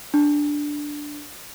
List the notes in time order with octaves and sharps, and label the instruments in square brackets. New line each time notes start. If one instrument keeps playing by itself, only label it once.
[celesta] D4